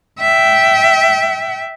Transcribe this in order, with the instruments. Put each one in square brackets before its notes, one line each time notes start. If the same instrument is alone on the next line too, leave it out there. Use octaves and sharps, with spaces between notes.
[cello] E5 G5